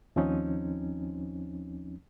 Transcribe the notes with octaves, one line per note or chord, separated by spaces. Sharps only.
D#2 F3 C4 C#4 D#4